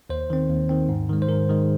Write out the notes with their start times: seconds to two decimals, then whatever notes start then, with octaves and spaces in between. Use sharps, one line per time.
0.10 D#2 C5
0.30 D#3 C4
0.50 D#2
0.69 D#3 C4
0.89 G#2
1.09 D#3 G#3
1.22 C5
1.29 G#2 A#4
1.49 D#3 G#3